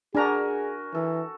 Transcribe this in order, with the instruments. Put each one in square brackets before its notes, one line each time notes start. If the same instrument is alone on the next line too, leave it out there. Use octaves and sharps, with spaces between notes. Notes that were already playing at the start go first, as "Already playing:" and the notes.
[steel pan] D4 A#5 [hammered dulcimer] F#4 A#4 G#5 [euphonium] G#4
[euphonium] E3 [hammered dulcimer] A4